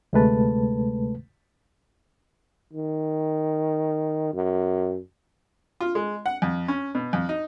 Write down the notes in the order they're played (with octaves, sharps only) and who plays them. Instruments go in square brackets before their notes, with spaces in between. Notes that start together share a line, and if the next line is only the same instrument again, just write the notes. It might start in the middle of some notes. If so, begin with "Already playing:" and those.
[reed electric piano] D2 C3 G#3 A3 B4 A5
[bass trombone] D#3
F#2
[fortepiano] F4
G#3
F#5
F2
C#4
B2
F2
D#4